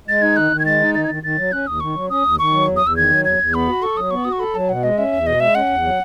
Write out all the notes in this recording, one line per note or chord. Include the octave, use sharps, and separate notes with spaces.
G#3 A6
D#4 G#6
D#3 F#6
D#3
G#6
G#3 A6
D#4
D#3 A6
G#6
D#3 A6
D#3 A6
F#3
C#4 F#6
D#2 D#6
D#3 C#6
F#3
C#4 D#6
D#2
D#3 C#6
F#3
E2
D#6
E2
E6
D#3 G#6
F#3
E2 G#6
E2
B3 B5
F#4
A4 C#6
F#3 D#6
B3 C#6
F#4 D#6
C#6
A4 B5
F#3 A5
B2 F#5
G#3 D#5
C#4 E5
E2
B2 D#5
G#3 E5
C#4 F#5
E2
F#3